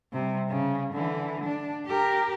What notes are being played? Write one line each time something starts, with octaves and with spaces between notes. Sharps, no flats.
C3 G3
C#3
D3 E3
D4
G4 A#4